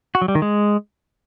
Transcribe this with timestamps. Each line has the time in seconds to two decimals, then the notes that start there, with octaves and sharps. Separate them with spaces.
0.15 F#4
0.22 F#3
0.28 G3
0.35 D#3
0.42 G#3